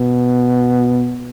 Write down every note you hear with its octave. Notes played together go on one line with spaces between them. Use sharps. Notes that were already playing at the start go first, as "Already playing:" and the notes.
Already playing: B2